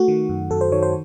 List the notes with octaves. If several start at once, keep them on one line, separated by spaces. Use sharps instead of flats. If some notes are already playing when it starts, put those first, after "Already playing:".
Already playing: A3 F#4
D#3
F#2
F#2 A4
C5
D#3 C#5
C5